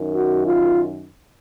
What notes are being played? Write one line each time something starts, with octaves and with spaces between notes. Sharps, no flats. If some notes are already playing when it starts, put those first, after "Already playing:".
Already playing: F#2 D#3
F#4
F4